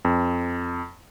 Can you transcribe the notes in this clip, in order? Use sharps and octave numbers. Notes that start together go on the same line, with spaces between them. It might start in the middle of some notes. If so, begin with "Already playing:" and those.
F2